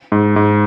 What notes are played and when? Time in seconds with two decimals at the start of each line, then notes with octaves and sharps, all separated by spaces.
0.12 G#2
0.36 G#2